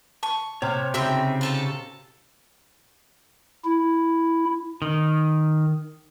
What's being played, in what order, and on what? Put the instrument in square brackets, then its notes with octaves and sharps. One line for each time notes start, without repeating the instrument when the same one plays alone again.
[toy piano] A5 [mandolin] C#6
[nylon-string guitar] C3 [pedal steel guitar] C#5 F6
[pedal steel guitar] C#3 C4 D#4 [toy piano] F#4 [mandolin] E5 G5 E6
[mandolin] F4 A4 A5
[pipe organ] E4
[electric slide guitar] D#3